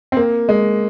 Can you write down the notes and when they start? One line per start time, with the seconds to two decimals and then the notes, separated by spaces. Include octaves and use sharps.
0.12 C4
0.17 A#3
0.49 G#3